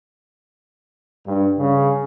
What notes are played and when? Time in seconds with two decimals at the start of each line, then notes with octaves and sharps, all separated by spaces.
1.27 G2
1.58 C#3